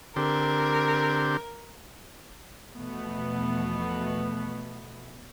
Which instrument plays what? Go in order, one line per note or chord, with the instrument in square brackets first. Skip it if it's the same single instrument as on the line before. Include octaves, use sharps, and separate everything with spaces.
[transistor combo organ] D3 C4 G4 [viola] A#4
[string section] E2 B2 F3 A3 B3